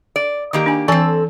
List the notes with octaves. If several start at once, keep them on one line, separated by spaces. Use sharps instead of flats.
D5
D#3 A#3 G4
D4 G#5
E3 C4 A4 G#5 A5